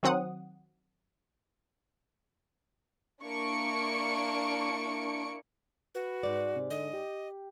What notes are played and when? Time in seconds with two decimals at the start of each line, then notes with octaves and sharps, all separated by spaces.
0.03 D#3 F#3 C4 F#5 D#6
3.22 A#3 D4 E4 C#6 C#7 D7
5.95 F#4 B4
6.23 G#2 D5
6.55 C3
6.70 D3 D#5
6.93 G4